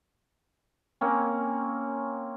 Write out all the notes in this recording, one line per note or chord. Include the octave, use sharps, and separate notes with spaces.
A#3 C4 C#4